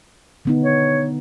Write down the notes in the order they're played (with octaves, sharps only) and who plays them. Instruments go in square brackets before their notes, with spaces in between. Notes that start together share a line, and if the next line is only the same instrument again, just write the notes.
[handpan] D3 B3 D#4
[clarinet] C#5